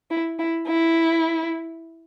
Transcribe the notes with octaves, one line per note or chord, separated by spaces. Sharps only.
E4
E4
E4